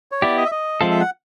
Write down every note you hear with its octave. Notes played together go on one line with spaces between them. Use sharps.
C#5
B3 E4 G4 D5
D#5
E5
D#5
F3 G#3 C4 F4 A4 E5
E5
F#5